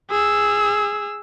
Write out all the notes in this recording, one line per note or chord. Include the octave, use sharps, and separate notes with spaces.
G#4 E6